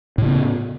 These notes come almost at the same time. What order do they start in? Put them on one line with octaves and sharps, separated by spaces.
A2 C#3 B3